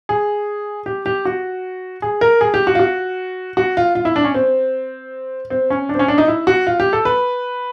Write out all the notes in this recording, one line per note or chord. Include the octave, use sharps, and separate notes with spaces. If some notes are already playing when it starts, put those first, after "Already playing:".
G#4
G4
G4
F#4
G#4
A#4
G#4
G4
F#4
F4
F#4
F#4
F4
F4
E4
D4
C#4
C4
C4
C#4
D4
C4
C#4
D4
D#4
E4
F#4
F4
G4
A4
B4